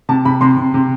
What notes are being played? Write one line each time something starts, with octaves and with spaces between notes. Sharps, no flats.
C3 A5
C3 B5
C3 C6
C3
C3